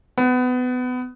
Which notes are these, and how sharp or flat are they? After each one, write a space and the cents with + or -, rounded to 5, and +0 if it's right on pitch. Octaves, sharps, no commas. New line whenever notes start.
B3 +25